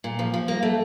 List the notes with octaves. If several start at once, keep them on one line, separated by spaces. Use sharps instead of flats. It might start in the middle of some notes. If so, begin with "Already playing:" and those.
A#2
F3
F3
A#3
A3